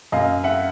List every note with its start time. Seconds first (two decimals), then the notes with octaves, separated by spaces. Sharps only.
0.12 F#2 D#5 F5
0.44 E5 F#5